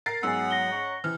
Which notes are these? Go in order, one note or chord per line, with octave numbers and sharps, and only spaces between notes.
A#4 A6 C7
G#2 F#3 B3 F#5 G#5 E6
A#6 G7
C#4 A#5 C#6
C3 E3 F3 F6